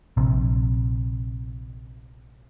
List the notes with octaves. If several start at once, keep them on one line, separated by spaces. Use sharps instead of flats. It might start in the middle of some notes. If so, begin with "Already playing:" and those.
A#1 C3